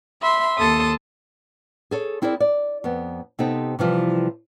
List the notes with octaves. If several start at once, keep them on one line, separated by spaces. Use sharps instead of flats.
E5 B5 C6
D#2 A4 A5 C6 D#6
G#4 A4 C#5
C4 E4 G#4 A#4 D5
D5
F2 B3
C3 B3 C4 D#4 G4 A4
C3 E3 F3 G3